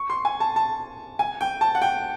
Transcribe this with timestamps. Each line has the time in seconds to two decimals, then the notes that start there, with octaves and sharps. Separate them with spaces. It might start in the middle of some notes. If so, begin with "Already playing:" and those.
Already playing: C#6
0.10 C6
0.25 G#5
0.40 A5
0.56 A5
1.19 G#5
1.41 G5
1.61 A5
1.75 F#5
1.82 G5